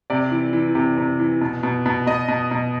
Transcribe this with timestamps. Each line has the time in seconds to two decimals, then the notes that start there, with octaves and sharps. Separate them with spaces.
0.10 C3 D5
0.31 E3
0.53 E3
0.75 C3
0.98 C3
1.19 E3
1.41 B2
1.63 B2
1.86 B2
2.07 B2 D#5
2.28 B2
2.51 B2